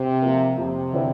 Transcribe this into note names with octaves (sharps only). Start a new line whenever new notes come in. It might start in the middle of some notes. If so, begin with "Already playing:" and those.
Already playing: C3
F3 A#3
F2 C3
D3 F3 C4 E4